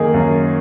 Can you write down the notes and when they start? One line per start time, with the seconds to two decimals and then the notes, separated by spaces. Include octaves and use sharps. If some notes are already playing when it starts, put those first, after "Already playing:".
Already playing: F#2 D#3 A#3 D#4 G#4
0.14 F#2